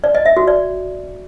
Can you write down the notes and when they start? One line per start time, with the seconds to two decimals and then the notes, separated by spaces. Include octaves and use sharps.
0.04 D5
0.15 D#5
0.26 E5
0.37 F#4
0.48 D5